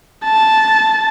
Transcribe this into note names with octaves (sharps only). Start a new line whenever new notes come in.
A5